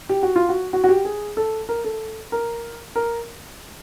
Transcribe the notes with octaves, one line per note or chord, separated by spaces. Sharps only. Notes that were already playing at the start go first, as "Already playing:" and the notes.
G4
F#4
F4
F#4
F#4
F#4
G4
G#4
A4
A#4
A4
A#4
A#4